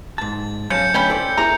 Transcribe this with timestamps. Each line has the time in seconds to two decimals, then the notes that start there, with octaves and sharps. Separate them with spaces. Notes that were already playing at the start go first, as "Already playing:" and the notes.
0.18 G#2 A5 A6
0.70 C#3 F#3 A5 G6 C#7
0.94 D3 A3 C#4 G5 B5
1.10 A4 C5 D5
1.37 A#3 E4 G#4 A#5